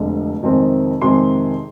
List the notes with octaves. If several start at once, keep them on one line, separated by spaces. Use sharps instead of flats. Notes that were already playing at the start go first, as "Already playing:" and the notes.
Already playing: F1 F2 D3 G#3
F2 C3 D#3 G#3 C4
F2 C3 D#3 G#3 C4 C6